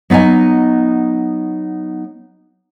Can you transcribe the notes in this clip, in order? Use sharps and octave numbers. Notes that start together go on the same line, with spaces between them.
F#3 B3 D#4 D#5 G#5